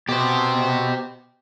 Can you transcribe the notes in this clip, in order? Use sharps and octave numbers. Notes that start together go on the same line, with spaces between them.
B2 G4 C5